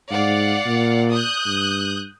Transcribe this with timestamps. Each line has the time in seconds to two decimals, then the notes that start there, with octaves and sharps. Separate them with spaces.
0.11 G#2 D5 F5 F#5
0.66 A#2
1.12 D#6 F#6 G6
1.46 G2